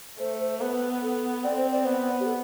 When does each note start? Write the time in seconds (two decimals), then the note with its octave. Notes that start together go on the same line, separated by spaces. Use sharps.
0.19 A3 C5
0.41 C5
0.61 B3 B4
1.03 A4
1.44 C4 D5
1.57 C5
1.71 D5
1.85 B3 C5
2.20 G4
2.26 A4